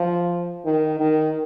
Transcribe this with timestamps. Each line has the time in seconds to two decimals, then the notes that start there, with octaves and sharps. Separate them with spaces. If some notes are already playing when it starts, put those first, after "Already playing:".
Already playing: F3
0.66 D#3
1.00 D#3